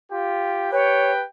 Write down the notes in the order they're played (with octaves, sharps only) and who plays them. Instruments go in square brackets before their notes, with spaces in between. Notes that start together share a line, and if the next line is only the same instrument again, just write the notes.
[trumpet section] F4 G4 G5
[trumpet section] G4 B4 G5 [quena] C#5